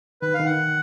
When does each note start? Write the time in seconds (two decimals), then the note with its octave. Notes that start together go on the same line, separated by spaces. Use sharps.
0.22 D#3 B4
0.34 F5
0.39 D#3
0.46 F#5